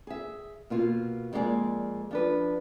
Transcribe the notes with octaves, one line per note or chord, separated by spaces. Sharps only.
G#4 E5
B2 A#3 F4
F2 G#3 A#3 F4 G#4 D5
F3 D4 B4